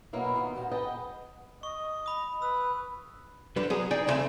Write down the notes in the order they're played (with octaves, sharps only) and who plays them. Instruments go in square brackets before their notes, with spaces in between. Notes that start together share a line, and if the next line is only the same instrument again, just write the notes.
[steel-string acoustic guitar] B2 F#3 A#3 E4
D#3 D#4 F4
D2 A#2 G3 F#4 G4
G#4 B4 D#5 F#5 G5 A5
[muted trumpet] D#5 [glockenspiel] C#6
[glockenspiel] B5 D#6
[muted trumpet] B4 [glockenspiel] E6
[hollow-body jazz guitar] D3 G3 B4
F#3 B3 G#4
D#4 G#4 D5 G5 G#5
D#2 A#2 C#3 A3 C4 G#5